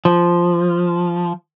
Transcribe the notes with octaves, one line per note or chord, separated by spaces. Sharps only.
F3